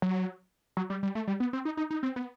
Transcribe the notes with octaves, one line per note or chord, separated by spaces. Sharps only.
F#3
F#3
G3
G3
A3
G3
B3
C4
D#4
D#4
D#4
C4
B3